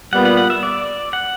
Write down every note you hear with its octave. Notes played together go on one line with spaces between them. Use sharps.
A#2 G3 B3 F#5
F#5
F#5
E5
D5
F#5